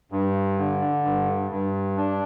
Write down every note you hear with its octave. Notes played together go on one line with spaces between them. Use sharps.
G2
D3
G2
G2
D4